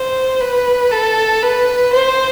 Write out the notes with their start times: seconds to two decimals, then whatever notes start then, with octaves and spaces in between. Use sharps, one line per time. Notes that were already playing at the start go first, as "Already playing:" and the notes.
Already playing: C5
0.41 B4
0.91 A4
1.43 B4
1.93 C5